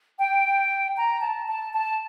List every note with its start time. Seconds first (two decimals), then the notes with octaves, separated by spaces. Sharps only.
0.18 G5
0.96 A#5
1.21 A5
1.47 A5
1.73 A5